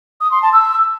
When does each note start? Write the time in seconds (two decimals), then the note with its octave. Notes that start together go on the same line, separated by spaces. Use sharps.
0.21 D#6
0.31 C6
0.42 A5
0.53 E6